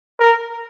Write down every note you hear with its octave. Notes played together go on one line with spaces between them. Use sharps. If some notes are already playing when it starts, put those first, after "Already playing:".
A#4